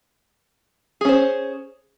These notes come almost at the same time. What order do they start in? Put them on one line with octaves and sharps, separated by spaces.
G#4 C#4 C5